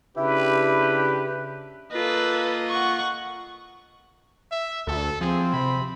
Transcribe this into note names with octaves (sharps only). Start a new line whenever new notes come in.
C#3 D4 E4 G4 B4
A#3 F4 A4 B4 D#5
F#5 C#6
E5
D2 A4
F3 C4 G#4
C3 B5